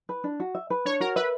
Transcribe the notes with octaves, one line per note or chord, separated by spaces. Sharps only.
B4
D4
F#4
E5
B4
D4 C#5
F#4 A#4
B4 E5